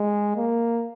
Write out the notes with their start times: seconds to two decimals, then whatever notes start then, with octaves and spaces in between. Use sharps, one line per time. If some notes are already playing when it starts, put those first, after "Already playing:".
Already playing: G#3
0.37 A#3